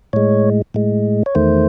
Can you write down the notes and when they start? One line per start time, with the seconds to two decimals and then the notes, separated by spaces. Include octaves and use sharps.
0.13 A2 G#3 C#5
0.74 A2 G#3
1.26 C#5
1.35 E2 D#3 A3 C5